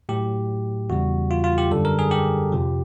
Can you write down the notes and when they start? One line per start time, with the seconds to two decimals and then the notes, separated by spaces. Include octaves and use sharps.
0.09 A2 F#3 G4
0.90 E2 C#3 E3 G3 F#4
1.31 F4
1.44 F4
1.58 G4
1.71 F#2 D3 G3 A4
1.85 A#4
1.99 G#4
2.11 G4
2.52 F2 C3 F3